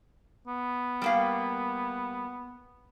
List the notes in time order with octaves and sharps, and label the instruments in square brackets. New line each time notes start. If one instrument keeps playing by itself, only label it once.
[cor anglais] B3
[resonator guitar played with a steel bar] G3 A#3 F5